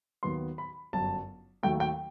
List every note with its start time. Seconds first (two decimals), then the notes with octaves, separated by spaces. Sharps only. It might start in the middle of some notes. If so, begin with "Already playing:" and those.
0.23 D#2 D#3 F#3 B3 C6
0.58 B5
0.93 G1 F#2 F#3 A5
1.63 D#2 D#3 F#3 A3 G5
1.80 G5